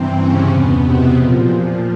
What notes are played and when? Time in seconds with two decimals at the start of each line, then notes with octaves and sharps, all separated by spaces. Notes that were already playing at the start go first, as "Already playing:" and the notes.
Already playing: G2 C3 E3 C4
0.15 C#3 C#4
0.48 E2 B2 B3
0.81 C3 C4
1.13 A#2 F3